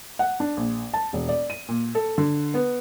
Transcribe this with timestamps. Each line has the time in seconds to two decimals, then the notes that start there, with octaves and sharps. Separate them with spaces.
0.19 F#5
0.40 D4
0.57 A#1
0.94 A5
1.13 E1
1.29 D5
1.50 D#7
1.68 A#2
1.95 A4
2.18 D3
2.54 B3